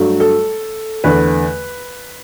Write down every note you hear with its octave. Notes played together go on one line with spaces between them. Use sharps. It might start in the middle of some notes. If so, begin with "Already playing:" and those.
Already playing: G2 F#3 A3
A4
E2 D3 A3 B4